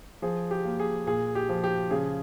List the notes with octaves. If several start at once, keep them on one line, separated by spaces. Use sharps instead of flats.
F3 G#4
G4
A#3
G#4
A#2 G#4
G4
F3
G4
C#3 G#4